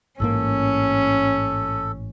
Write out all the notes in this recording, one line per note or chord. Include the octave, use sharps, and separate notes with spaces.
A1 G#2 A#3 C#4 A4